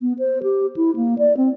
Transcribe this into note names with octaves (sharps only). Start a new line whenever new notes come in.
B3
C5
G4
E4
A#3
D5
C4